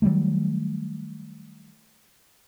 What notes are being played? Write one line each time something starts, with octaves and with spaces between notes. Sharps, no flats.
D#3 F#3 G3 A3